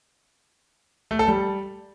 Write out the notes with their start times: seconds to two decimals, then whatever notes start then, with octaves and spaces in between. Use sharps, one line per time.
1.11 A3
1.19 A4
1.28 G3